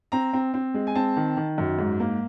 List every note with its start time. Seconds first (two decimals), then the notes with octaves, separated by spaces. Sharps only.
0.12 C4 A#5
0.33 C4
0.54 C4
0.74 G#3
0.87 G#5
0.95 C4 A5
1.16 D#3
1.37 D#3
1.58 F#2
1.78 G#2
2.00 A#3